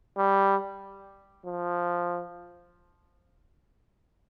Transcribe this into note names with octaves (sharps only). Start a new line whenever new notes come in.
G3
F3